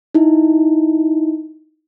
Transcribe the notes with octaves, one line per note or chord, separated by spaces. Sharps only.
D#4 E4